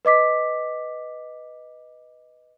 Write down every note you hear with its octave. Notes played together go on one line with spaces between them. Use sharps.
B4 D#5 D6 B6